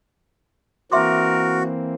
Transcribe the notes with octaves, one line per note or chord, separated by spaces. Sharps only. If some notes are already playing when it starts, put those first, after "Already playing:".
E3 A#3 C4 F#4 A#4 E5 C6 D6